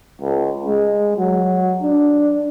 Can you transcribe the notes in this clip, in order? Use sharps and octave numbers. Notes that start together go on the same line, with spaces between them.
C#2
G#3
F#3
D4